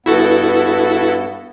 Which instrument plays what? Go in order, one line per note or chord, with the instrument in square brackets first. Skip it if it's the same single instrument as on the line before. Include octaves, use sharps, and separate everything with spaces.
[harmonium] G2 B3 [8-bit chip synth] E4 F#4 A4